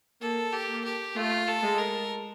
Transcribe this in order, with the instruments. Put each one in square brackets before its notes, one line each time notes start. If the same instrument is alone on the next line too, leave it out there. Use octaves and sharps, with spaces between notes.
[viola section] A#3 [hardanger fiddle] A4
[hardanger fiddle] G4
[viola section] A#3
[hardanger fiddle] G4
[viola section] A3 [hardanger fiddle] F4
[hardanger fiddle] A4
[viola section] G#3
[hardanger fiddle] A#4